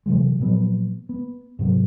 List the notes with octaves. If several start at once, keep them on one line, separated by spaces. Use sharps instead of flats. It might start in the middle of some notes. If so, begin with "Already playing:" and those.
C3 E3 F#3 G#3
A#2 F3 F#3 B3
B3
G#2 C3 F#3 C4